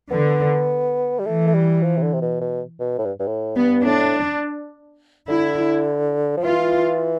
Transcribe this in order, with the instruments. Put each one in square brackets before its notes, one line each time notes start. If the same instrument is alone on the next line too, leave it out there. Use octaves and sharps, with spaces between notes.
[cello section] D3 [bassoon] B3
[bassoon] G3
[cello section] E3 [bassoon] A3
[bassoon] A3
G3
F3
C3
D3
C3
B2
B2
B2
A2
G2
G2
A2
[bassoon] G2 [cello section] B3
[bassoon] A2 [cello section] D4
[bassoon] D3 [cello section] E4
[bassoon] F3
[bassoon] E3 [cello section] F4